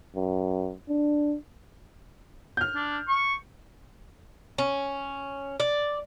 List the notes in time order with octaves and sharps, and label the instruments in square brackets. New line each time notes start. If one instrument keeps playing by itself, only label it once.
[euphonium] F#2
D4
[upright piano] F6 G6
[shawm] D4
C#6
[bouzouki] C#4
D5